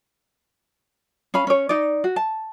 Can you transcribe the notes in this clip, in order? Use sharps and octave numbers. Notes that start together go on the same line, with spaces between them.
C#4 F5 B5
C#4 C#5
D#4 D5
F#4
A5